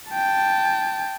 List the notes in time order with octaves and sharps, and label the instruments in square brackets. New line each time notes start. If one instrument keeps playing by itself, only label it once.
[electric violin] G5 A5